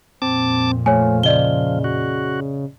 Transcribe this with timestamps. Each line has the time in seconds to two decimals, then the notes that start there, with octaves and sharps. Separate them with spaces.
0.22 F2 A#2 C4 A5 D6
0.86 F3 A3 C#5 G#5
1.23 C#3 D5 D#5 G7
1.84 F#4